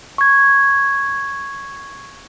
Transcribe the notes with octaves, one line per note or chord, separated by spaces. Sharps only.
C#6 G#6